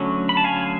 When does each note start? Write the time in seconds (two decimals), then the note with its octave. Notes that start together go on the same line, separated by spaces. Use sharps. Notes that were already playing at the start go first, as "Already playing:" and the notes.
Already playing: D3 F#3 A3 C#4
0.29 B5
0.37 A5
0.44 F5 G#5